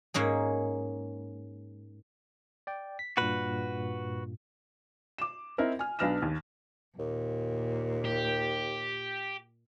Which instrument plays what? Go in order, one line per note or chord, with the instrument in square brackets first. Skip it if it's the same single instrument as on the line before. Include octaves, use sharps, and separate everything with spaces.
[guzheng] G#2 A#3 C#4 G#4
[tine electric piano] D5 G5
B6
[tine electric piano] G2 A#2 [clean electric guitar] F#4 B4
[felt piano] D6 E7
C4 D#4 E4 A#4
G#5 F6
B1 D4 B4 F6 A#6 E7
D#2
[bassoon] D#2 [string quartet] A#2
[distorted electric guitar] G4